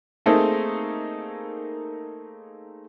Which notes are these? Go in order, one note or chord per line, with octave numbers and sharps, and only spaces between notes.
A3 A#3 C4 D#4 G#4 A4